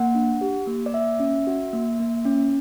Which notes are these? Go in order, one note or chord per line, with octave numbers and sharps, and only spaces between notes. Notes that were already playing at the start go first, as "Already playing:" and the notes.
Already playing: A#3 F#5
D4
G4
A#3
D5
A#3 E5
C#4
F#4
A#3
A#3
C#4